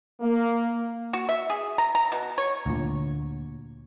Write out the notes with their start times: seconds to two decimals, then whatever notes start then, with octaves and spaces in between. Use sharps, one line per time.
0.20 A#3
1.13 F#4
1.29 E5
1.50 G#4
1.78 A#5
1.95 A#5
2.12 B2
2.38 C#5
2.66 D2 A#2